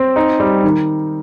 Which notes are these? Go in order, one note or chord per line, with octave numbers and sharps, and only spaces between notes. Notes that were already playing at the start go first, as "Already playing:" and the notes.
Already playing: C4
D#4
G3
D#3